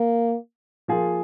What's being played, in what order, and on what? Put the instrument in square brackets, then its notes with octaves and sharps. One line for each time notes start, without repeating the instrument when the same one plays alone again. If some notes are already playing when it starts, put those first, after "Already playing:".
Already playing: [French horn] A#3
[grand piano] F3 A#3 F4 G#4